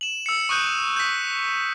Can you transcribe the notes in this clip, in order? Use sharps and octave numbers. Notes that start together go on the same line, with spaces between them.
E7 F#7
E6 C#7
C#6 D#6 F#6 G6 D#7
G6 B6